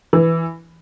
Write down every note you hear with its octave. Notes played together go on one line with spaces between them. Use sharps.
E3